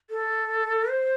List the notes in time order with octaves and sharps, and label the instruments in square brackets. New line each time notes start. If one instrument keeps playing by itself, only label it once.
[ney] A4
C5